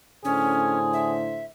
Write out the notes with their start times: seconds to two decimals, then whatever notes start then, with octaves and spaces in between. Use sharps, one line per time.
0.25 A2 D3 C#4 G#4 C5
0.93 E5